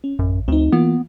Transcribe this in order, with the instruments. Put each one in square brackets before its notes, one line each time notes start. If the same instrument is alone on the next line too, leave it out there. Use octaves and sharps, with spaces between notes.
[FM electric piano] C#4
[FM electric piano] A1 [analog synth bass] F#2
[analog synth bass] D2 [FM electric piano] C4 D#4
[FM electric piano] E3 A#3 F4 [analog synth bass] B3